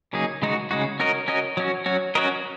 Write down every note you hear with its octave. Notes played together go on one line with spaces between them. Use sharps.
C#3 F#3 A#3 D#4 G#4
C#3 G#3 D#4 F#4
C#3 G#3 D#4 F#4
C#4 F#4 A#4 D#5
C#4 F#4 A#4 D#5
F#3 C#4 F#4
F#3 C#4 F#4
C#4 F#4 A#4 D#5